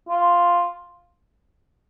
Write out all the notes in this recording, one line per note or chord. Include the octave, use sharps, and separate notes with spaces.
F4